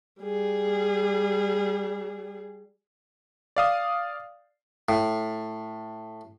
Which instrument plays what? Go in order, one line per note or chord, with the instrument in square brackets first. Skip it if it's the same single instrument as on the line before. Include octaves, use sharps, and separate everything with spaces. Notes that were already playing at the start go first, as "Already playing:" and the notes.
[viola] G3 G#4
[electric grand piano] D5 F5 D#6
[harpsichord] A2